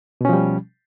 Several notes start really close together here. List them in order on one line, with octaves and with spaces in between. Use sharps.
B2 C#4 F3 G3